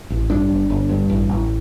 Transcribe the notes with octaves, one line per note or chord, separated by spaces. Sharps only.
A1
G2 D4
G1
G1
G2
A1
A1